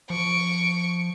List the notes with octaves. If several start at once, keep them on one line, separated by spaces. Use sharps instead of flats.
F3 C#6 D7